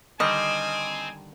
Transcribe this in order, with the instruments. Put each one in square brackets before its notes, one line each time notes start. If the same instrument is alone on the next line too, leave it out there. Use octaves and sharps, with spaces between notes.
[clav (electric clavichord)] D3 D#3 G3 [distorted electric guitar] C4 [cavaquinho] D#5 [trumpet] G#5